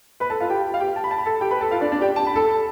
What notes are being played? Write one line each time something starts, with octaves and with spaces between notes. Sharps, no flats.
B4 B5
A4 A5
F4 F5
G4 G5
F5
G4 G5
A5
B5
A5
B5
A4 A5
G4 G5
B4 B5
A4 A5
F4 F5
D4 D5
D4 D5
G4 G5
A5
B5
A4 A5